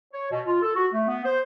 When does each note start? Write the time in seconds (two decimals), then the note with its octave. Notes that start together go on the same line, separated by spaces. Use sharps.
0.12 C#5
0.31 B2
0.45 F4
0.61 A4
0.75 F#4
0.93 A3
1.08 B3
1.24 C5